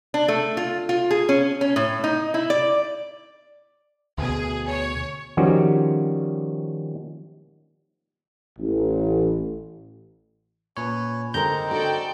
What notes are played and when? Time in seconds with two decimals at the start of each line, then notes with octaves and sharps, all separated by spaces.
0.14 D4
0.28 A3
0.57 F4
0.89 F4
1.11 G#4
1.29 C#4
1.61 C#4
1.76 A2
2.04 D#4
2.34 E4
2.50 D5
4.18 D2 B2 G#4
4.67 C#5
5.37 D#3 F3 G3 C#4 F#4
8.59 A1
10.77 A#2 C#4 B4 C#5
11.34 D3 G#3 C4 D#4 A#4 A#5 G6
11.71 F#4 A4 D5 G5